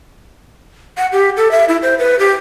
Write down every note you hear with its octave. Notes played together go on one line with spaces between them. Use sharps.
F#5
G4
A4
E5
E4
C5
B4
G4